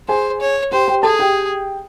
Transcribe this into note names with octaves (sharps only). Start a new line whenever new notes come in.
G#4 C5 G#5
C#5
G4 C5 G5
G4 G5
G#4 A4 A5
G4 G5